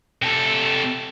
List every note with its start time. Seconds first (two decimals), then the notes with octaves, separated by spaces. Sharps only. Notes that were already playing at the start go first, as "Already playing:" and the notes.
0.22 C3 A4